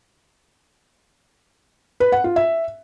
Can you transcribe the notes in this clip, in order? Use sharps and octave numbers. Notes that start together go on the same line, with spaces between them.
B4
F#5
F4
E5